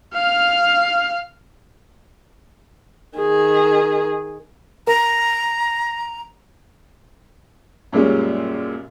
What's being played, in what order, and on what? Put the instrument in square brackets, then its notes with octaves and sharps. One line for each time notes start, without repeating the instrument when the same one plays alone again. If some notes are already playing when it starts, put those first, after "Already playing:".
[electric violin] F5 F6
[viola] D#3 G#4
[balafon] A#4 [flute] A#5
[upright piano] F#2 A#2 G3 G#3 C#4